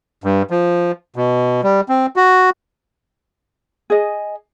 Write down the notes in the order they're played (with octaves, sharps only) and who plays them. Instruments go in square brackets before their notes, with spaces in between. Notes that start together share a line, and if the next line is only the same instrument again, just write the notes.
[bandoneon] G2
F3
B2
G3
C4
F#4
[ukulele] G#4 D#5